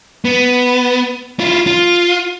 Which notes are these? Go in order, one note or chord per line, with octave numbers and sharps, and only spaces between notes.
B3
E4 F4
F4